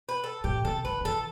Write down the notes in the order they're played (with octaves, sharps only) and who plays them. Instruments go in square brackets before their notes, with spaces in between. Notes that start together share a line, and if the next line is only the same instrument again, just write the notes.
[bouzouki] B4
A4
[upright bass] A2 [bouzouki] G4
[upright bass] C3 [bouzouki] A4
[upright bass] D#3 [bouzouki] B4
[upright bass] D#3
[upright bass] E3 [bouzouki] A4